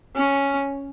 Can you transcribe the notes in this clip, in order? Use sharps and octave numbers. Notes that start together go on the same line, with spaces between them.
C#4